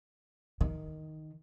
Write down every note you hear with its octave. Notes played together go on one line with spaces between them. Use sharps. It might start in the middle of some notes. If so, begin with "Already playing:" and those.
D#3